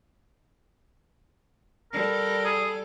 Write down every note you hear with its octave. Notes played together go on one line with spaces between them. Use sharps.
G3 A4 A#4
G#4